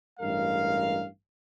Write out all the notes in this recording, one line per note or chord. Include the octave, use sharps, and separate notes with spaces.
A1 G2 G#3 A#4 F5